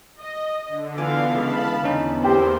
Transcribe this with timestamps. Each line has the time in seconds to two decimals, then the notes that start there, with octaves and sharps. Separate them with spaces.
0.21 D#5
0.68 D3
0.98 E3 B3 F4 F5 G#5 D6
1.35 C#3 G#3 A5 B5
1.83 E2 D3 C#4 D#4
2.24 A#3 C4 G4 C5